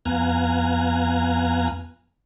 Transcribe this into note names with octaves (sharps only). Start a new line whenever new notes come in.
F2 B3 F5 G#5 A#5 F#6